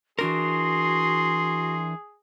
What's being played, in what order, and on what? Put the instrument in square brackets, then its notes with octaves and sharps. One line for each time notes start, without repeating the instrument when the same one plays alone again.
[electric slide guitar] E3 D4 A#4 [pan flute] F#4 [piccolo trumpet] G#4 [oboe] C6